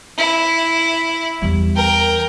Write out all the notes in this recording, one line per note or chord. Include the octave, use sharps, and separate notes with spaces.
E4
E2 G3
A#4 G5